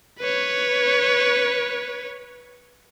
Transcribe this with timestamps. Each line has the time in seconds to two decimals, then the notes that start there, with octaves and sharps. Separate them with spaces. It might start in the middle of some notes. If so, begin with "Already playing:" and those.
0.19 B4 C#5